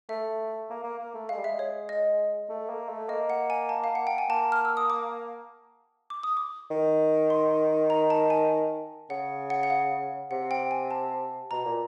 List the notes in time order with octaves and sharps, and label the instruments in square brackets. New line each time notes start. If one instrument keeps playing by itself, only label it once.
[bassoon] A3 [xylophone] E5
[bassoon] A#3
A#3
A#3
A3
[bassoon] G#3 [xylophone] F5
[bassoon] G3
[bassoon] G#3 [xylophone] E5
[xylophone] C#5
D#5
[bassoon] A3
A#3
A3
[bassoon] A#3 [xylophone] D#5
[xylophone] F#5
G#5
A5
F5
F#5
G5
G#5
[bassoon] A#3 [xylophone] A5
[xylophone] F6
E6
D#6
D6
D6
D#6
D6
[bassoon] D#3
[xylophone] C6
A#5
A5
G#5
[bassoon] C#3 [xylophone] F#5
[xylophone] F#5
F#5
F5
[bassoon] C3 [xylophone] F#5
[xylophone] G5
G#5
A5
[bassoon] B2 [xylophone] A#5
[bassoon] A#2